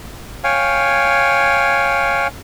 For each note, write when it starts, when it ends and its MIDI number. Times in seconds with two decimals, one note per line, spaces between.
0.44 2.27 73
0.44 2.27 77
0.44 2.27 79
0.44 2.27 80